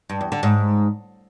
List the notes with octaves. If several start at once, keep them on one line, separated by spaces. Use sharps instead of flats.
G2
E2
D3
G#2